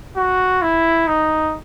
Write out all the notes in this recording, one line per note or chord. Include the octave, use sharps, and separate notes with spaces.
F#4
E4
D#4